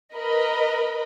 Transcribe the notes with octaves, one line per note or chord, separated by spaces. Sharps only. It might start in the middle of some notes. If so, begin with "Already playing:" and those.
A#4 B4 D#5 B5